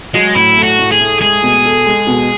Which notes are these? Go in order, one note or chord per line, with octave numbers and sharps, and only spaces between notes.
F#3 G#3
A2 E4
A3
F#4
A2
G#4
A3
G#3 G#4
B2
A4
G#3
B2